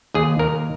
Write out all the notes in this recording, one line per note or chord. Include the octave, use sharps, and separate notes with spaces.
D#2 G#4
D#2 A#4